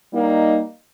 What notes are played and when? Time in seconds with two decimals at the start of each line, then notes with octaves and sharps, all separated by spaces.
0.13 G3 A#3 D#4